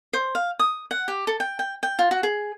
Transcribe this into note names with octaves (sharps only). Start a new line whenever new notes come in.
C5
F5
D#6
F#5
G4
A4
G5
G5
G5
F4
F#4
G#4